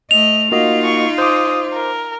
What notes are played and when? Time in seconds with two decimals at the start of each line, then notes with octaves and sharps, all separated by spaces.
0.11 A3 D#5 F7
0.52 A#3 D#4 F4 F#4 D#5
0.84 C#6
1.18 C5 D6 D#6
1.73 A#4